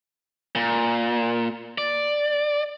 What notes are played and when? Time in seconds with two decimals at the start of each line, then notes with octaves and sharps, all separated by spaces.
0.55 A#2
1.78 D5